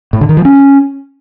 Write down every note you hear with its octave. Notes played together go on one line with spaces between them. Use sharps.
A2
D3
D#3
F3
C#4